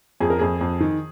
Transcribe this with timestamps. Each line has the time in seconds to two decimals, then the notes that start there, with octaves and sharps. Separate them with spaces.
0.21 F2 G#4
0.30 A#4
0.39 F2 G#4
0.61 F2
0.80 D#3